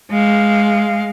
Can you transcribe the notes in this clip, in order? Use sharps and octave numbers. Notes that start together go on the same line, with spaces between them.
G#3 F5